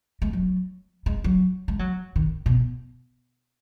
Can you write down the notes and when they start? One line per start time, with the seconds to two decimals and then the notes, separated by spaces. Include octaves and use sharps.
0.22 G#3
0.33 F#3
1.06 G#3
1.24 F#3
1.68 G#3
1.79 F#3
2.16 D#3
2.46 B2